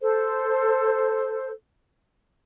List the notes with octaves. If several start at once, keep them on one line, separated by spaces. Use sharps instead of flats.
A4 C5